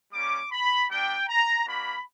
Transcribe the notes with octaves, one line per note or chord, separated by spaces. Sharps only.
G3 A#3 C#4 D6
B5
G3 B3 D4 G5
A#5
A#3 D4 F#4 B5